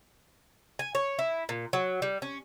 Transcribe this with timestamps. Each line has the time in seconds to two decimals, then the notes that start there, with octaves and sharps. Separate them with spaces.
0.79 G#5
0.95 C#5
1.19 E4
1.49 A#2
1.73 F#3
2.02 G3
2.22 C#4